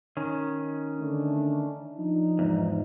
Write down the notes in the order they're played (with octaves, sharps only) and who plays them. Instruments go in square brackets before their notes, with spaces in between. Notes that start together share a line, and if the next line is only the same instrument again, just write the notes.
[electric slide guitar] D#3 C#4
[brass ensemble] D3 A3 D4
F3 D4 D#4
[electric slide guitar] E2 G#2